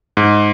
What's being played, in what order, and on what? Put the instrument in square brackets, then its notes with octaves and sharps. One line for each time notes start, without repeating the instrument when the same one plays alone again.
[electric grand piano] G#2